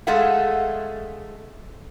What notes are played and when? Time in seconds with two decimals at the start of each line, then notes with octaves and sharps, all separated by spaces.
0.07 G#3 A3 G#4 A4 F5 F#5